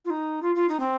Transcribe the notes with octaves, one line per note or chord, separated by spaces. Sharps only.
F4
D#4
F4
F4
D#4
C4